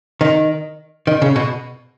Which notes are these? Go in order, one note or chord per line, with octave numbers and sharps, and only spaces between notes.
D#3
D#3
C#3
B2